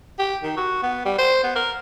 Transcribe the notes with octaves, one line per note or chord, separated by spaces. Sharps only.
G4
D#3
F#4
B3
G3
C5
B3
A#4